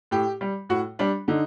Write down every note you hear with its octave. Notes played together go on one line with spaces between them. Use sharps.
A2 G4
G3
A2 F#4
G3 D4
D3 D#4